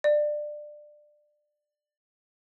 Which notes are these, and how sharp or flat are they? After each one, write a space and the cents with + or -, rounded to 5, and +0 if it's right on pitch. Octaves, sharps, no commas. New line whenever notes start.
D5 +20